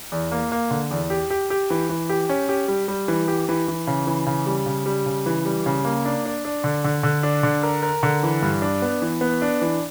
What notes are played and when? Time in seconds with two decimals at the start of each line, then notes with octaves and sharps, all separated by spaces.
0.12 E2
0.32 A#3
0.52 A#3
0.71 D3
0.91 E2
1.10 G4
1.30 G4
1.50 G4
1.70 E3
1.89 E3
2.09 G4
2.29 C#4
2.49 G4
2.68 G3
2.88 G3
3.08 E3
3.28 G4
3.49 E3
3.68 E3
3.87 C#3
4.07 E3
4.26 C#3
4.46 G3
4.66 C#3
4.86 G3
5.06 C#3
5.26 E3
5.45 G3
5.66 C#3
5.85 A#3
6.05 D4
6.25 D4
6.45 D4
6.64 D3
6.84 D3
7.03 D3
7.23 D4
7.43 D3
7.63 A#4
7.83 A#4
8.03 D3
8.23 E3
8.42 G2
8.62 D4
8.82 B3
9.02 E3
9.21 B3
9.42 D4
9.62 E3